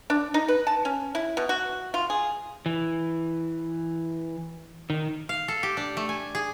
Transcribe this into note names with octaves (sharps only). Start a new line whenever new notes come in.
D4
D#4
B4
A5
C#4
E4
B2
F#4
F4
G#4
E3
D#3
F5
A4
G4
D4
A3
G#5
G#4